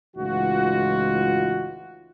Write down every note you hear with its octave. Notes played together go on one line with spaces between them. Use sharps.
C#2 A2 E3 D#4 F4 F#4